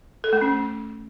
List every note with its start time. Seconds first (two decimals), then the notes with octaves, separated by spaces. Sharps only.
0.24 A4
0.33 A3
0.41 C#4